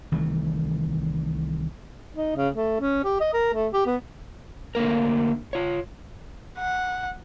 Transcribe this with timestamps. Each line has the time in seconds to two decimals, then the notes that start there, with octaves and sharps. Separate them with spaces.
0.12 C2 D#3 E3 A3
2.15 D#4
2.36 C#3
2.55 A3
2.81 C#4
3.04 G4
3.20 D#5
3.33 A#4
3.54 A3
3.73 G4
3.86 B3
4.75 D3 A3 A#3 A#4
5.53 F4 C#5
6.58 F#5